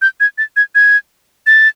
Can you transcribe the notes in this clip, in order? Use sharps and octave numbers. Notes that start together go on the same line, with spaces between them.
G6
G#6
A6
G#6
G#6
A6